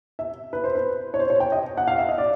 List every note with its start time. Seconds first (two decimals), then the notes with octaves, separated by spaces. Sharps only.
0.19 E5
0.53 B4
0.64 C5
0.75 B4
1.14 C#5
1.19 C5
1.30 C#5
1.40 G5
1.52 D#5
1.77 F#5
1.88 F5
1.98 E5
2.09 D#5
2.18 D5